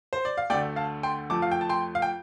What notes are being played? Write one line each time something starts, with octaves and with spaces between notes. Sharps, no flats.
C5
D5
F5
D2 D3 A3 D5 G5
F5 A5
G5 C6
F2 F3 A3 A5 D6
F5
G5
A5
G5 C6
F5
G5